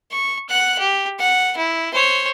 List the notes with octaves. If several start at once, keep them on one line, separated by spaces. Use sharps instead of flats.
C#6
F#5 F#6
G4
F#5
E4
C5 C#5